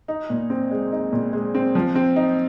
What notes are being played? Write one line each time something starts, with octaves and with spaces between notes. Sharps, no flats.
D#4
A#2
C4
G#3
D#4
A#2
G#3
C4
F3
C4
D#4